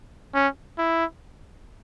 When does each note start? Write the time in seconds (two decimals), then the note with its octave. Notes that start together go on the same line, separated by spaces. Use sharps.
0.34 C#4
0.78 E4